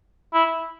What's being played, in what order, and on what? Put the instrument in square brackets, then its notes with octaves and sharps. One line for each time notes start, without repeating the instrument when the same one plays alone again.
[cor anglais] E4